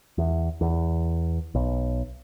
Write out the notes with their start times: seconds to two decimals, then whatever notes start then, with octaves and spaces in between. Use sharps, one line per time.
0.18 E2
0.61 E2
1.55 B1